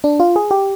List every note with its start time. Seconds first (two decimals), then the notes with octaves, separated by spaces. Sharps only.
0.04 D4
0.20 F4
0.36 G#4
0.51 G4